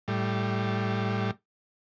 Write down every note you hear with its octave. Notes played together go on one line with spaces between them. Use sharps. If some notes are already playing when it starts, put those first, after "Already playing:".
A2 G3